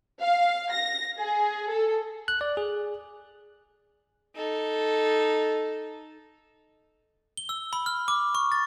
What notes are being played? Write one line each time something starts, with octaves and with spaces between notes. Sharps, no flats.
F5
A#6
G#4
A4
F#6
D5
G#4
D#4 A4
G7
E6
B5
F6
D6
C#6
A6